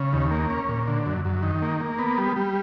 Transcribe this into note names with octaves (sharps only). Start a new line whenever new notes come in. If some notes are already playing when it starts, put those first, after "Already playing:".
Already playing: C#3
D#2
A#3
C#4
A#2
D3
F#2
F#2
D#3
A#3
A#3
B3
G3
G3